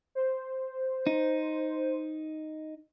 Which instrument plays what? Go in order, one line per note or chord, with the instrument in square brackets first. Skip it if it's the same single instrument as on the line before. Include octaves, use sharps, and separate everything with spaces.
[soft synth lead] C5
[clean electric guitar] D#4